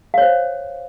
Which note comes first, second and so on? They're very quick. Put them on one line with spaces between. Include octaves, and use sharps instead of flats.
F5 C#5 C5